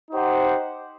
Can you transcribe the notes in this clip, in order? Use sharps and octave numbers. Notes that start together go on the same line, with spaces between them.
D#4 G4 C5 F#5